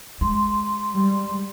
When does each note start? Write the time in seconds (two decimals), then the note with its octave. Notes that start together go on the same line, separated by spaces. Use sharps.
0.21 G#3 C6
0.94 G3